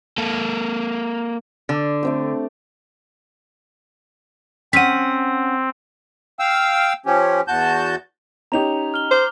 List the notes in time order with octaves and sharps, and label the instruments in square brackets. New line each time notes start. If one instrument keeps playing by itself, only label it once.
[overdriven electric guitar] A#3 A4
[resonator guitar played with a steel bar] D3
[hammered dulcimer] A3 C4 G4
[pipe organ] C4 [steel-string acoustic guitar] C#4 F#5 [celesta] B6 D#7
[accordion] F5 G5 E6
F3 C#4 G4
E2 F#4 A5 G6
[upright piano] C#4 D#4 G4 [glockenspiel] A#5 F7
[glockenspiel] F6 G7
[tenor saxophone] C5 [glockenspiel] D6 F6